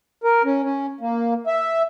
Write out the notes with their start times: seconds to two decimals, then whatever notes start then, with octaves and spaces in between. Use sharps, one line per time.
0.24 A#4
0.45 C#4
0.63 C#4
1.01 A#3
1.47 E5